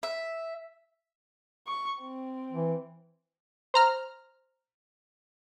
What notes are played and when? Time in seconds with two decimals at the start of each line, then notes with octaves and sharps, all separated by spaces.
0.03 E5
1.67 C#6
2.01 C4
2.52 E3
3.74 C5 A#5 F6